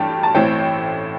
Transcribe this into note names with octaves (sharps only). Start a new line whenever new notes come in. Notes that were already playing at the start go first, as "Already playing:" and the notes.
Already playing: G2 E3 A3 G5 A5
A5
A1 A2 E3 A3 C4 G5